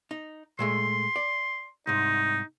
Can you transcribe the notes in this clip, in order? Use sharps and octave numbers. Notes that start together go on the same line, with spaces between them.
D#4
A#2 G#3 A3 C6
D5
C2 G#2 D#4